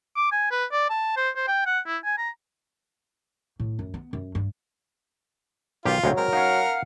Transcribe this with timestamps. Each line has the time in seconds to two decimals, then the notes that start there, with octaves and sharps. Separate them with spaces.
0.16 D6
0.32 G#5
0.51 B4
0.72 D5
0.90 A5
1.17 C5
1.36 C5
1.47 G5
1.66 F#5
1.87 E4
2.04 G#5
2.18 A#5
3.60 A2
3.79 F#2
3.94 B3
4.13 F#2
4.35 G2
5.85 B1 D#3 F4 G4
6.04 D2 F#3 G#3 C4
6.18 G#3 C4 A#4
6.33 C#4 D#4 F5 F#5 F6